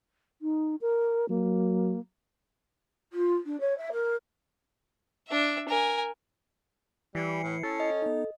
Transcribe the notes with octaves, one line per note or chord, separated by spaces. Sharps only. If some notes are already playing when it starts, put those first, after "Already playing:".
D#4
A#4
F#3 A#3
F4
D4
C#5
E5
A#4
D4 E5
A#4 G#5
E3 G3 E4 C7 C#7
A2
C#4 A4
D#5
B3 D#4